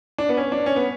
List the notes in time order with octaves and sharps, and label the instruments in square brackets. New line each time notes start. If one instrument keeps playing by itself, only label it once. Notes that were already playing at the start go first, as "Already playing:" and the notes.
[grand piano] D4
B3
C#4
D4
C#4
B3